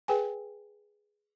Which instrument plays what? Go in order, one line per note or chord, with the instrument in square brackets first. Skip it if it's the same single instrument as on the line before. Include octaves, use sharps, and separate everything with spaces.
[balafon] G#4 B4 G5 G#5